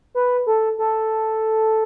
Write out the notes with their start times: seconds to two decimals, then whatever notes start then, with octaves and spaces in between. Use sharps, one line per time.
0.15 B4
0.47 A4
0.78 A4